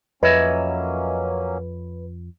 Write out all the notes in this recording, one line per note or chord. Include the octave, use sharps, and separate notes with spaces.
F2 F#3 A#3 C#4 B4 C#5 D#5 E5